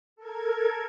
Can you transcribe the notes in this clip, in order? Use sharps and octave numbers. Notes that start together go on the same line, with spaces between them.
A4 A#4 G#6